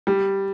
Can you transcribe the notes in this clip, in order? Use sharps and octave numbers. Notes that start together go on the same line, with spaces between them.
G3